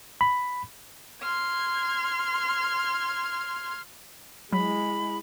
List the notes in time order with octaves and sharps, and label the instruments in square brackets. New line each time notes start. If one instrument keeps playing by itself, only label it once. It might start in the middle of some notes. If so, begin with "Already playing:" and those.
[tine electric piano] B5
[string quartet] C6 F6 G#6
[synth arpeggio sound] F#3 [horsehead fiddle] G#3 E4 [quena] B5